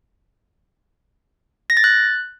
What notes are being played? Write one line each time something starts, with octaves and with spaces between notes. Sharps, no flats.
A#6
A6
F#6